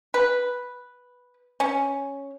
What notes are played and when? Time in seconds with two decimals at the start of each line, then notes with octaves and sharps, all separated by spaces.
0.14 B4
1.60 C#4